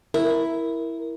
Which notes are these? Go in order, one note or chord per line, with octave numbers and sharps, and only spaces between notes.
E4 A#4